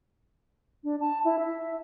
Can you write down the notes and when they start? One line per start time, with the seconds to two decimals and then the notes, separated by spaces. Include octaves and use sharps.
0.84 D4
1.00 A5
1.24 E4
1.39 E5